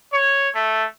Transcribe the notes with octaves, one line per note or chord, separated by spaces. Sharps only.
C#5
A3